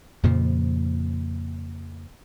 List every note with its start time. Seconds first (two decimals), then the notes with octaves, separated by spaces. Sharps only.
0.23 F2 A#2 C#3 F3